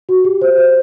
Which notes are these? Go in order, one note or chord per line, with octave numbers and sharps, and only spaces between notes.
F#4
G4
C5
C5